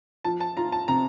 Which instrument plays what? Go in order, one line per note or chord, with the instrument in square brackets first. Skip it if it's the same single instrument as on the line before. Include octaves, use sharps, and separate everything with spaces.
[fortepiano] F3 [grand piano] A5
[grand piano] A5
[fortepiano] F4 [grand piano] A#5
[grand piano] A5
[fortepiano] C3 [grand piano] A#5